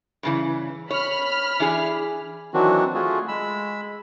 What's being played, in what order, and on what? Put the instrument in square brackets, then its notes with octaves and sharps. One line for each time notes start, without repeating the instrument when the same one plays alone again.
[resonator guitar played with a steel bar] G2 C#3 E3
[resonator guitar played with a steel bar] C#5 [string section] B5 F6
[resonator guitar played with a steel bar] E3 D4 G#4
[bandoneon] D#3 E3 F#3 C4 D4 F#4
A3 F4 F#4 G#4
G#3 B5 E6